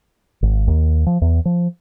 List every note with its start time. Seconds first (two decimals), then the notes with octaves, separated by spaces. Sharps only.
0.42 G#1
0.68 D#2
1.06 F3
1.22 E2
1.45 F3